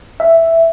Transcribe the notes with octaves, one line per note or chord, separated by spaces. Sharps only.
E5